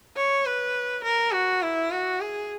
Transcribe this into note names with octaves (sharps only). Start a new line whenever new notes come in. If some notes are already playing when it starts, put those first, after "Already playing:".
C#5
B4
A#4
F#4
E4
F#4
G#4